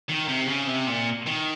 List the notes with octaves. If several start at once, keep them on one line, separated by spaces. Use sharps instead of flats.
D#3
C3
C#3
C3
A#2
D#3